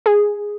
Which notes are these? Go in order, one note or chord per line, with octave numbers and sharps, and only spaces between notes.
G#4